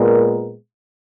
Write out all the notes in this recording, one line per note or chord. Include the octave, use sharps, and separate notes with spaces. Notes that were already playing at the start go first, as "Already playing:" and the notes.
Already playing: A#2 G#3 B3 A#4